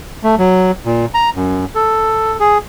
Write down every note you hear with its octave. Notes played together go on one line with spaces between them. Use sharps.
A3
F#3
A#2
A#5
F#2
A4
G#4